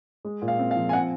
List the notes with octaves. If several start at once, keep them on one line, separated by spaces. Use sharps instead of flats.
G#3
A#2
F5
C4
F5
F3
G#5
C4 F#5